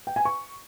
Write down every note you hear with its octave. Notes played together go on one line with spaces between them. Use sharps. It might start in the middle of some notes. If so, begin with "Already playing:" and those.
G5
G#5
C#6